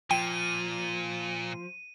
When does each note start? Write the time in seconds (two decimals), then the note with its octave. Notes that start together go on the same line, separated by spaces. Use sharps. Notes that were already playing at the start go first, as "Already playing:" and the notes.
0.11 A#2 F3 G5 D#7